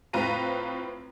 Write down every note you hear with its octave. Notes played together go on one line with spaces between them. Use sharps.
A2 C4 F4 B4 A#5 D#7